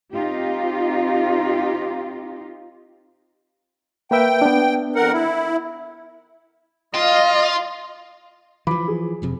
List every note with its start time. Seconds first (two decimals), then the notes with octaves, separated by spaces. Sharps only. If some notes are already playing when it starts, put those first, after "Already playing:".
0.12 C4 D#4 F4 G4
4.11 A#3 B4 E5 G5
4.42 B3 D4
4.96 F2 A#4 F#5
5.13 E4
6.95 F4 D#5 F5
8.67 E3 F3 B5 D6
8.88 G#4
9.22 E1 F2 C3